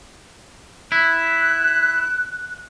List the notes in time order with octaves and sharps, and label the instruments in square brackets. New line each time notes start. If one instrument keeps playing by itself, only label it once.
[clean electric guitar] E4 [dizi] F#6